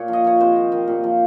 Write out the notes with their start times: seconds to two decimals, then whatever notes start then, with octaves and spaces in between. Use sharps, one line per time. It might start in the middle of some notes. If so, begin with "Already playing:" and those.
Already playing: A#2 C#5
0.08 F3
0.13 D#5
0.24 F3 C#5
0.40 C3 C5
0.56 D#3
0.72 D#3
0.88 A#2
1.04 F3